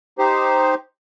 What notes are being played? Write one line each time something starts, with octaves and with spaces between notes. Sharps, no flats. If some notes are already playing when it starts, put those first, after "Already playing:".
D#4 G4 C5